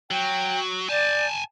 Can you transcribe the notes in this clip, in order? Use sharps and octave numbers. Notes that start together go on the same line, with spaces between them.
F#3 G5
D5 G#5 A5 G6